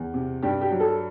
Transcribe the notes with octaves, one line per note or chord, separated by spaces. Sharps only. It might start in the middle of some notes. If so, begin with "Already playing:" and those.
Already playing: E2
C3
G2 G4
G4
F#3
A4